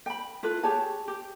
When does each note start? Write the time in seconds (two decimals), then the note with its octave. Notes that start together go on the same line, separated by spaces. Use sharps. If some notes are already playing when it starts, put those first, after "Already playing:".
0.06 G5 B5
0.43 E4 F4 A4 B4
0.63 G4 G#4 C#5 A5
1.08 G4